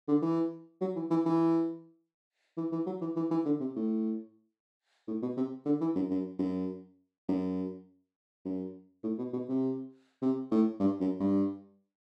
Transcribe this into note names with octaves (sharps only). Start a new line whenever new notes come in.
D3
E3
F#3
E3
E3
E3
E3
E3
F#3
E3
E3
E3
D3
C3
A2
A2
B2
C3
D3
E3
F#2
F#2
F#2
F#2
F#2
A2
B2
B2
C3
C3
A2
G2
F#2
G2